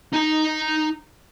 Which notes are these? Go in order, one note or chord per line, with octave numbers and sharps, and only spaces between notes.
D#4 A#5